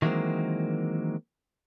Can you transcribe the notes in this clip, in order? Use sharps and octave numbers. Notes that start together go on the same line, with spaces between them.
D#3 E3 F#3 G#3 A#3 C4